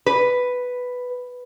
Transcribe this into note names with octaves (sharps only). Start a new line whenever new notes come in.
B4